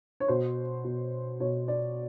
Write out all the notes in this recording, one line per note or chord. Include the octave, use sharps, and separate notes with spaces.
C#5
B2 C5
B2
B2 C#5
D5